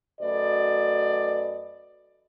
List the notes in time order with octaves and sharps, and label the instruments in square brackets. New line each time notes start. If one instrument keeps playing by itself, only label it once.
[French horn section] F#2 A3 F#4 B4 D5 D#5